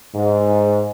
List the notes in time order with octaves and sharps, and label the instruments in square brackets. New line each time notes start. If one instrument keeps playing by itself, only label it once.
[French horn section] G#2